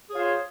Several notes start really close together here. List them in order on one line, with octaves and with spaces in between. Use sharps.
G#4 C#5 F4 C5